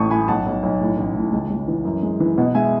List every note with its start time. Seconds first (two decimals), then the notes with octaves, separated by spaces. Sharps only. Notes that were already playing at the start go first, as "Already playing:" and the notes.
Already playing: A1 A2 A5 C#6 D#6
0.11 A2 G#5 B5
0.28 B1 F#5 A5
0.46 B1
0.63 B1
0.80 A2
0.98 A1
1.15 A2
1.32 C#2
1.50 C#2
1.68 E3
1.85 F#2
2.03 G#3
2.20 E3
2.38 B2 D#5 F#5
2.55 G#3 E5 G#5